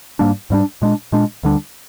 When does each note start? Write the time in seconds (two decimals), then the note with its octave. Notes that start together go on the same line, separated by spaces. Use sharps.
0.19 G#2 G3 A#3 D4
0.50 G#2 G3 A#3 D4
0.82 A#2 G#3 D4
1.12 A#2 G#3 D4
1.43 D2 D3 G3 D4